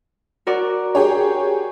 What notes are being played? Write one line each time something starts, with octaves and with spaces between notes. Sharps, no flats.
F#4 A#4 D5
G4 G#4 C#5